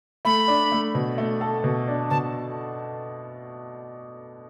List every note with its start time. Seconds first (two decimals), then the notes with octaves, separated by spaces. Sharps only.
0.25 A3 B5
0.48 D4
0.72 A3
0.95 B2
1.18 A3
1.41 A4
1.64 B2
1.88 D4
2.10 B2 A5